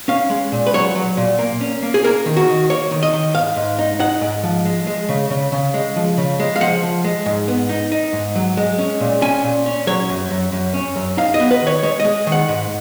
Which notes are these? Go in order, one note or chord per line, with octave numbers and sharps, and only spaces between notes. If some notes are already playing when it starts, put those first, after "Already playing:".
C#4 F5
G#3
A#2
B4
F#3 C#5
F#3
A#2
A#3
C#4
A#3
G#4
A#3 A#4
D#3
F#4
D#3
A#3 C#5
D#3
D#5
D#3
G#2 F5
G#2
D#4
D#4 F#5
G#2
F3
G#3
G#3
C#3
C#3
C#3
G#3
F3
C#3
G#3
F5
F3 F#5
F3
G#3
G#2
B3
D#4
D#4
G#2
F#3
G#3
C#4
A#2
C#4 G#5
A#2
C#4
F#3 C#5
F#2
F#2
F#2
C#4
F#2
D#4 F5
D#5
B3
B4
D#3 C#5
G#3 C#5
D#5
G#3
D#3
F#5
G#2